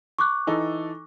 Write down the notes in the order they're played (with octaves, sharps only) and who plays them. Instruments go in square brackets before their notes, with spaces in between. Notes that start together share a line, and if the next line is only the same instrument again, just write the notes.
[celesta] C#6 D6 F#6
[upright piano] E3 D#4 A4